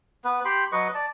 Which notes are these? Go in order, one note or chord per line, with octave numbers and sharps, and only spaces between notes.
B3 B4
G4 G5 B5 C6
F#3 B4 D#5 C#6
D5 A5